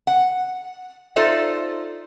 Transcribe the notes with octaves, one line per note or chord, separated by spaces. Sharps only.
F#5
D#4 F4 A4 C5 D5 E5